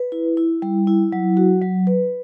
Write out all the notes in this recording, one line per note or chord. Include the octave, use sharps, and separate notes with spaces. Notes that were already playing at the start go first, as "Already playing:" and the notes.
Already playing: B4
E4
E4
G3
E4
F#3
F#4
F#3
B4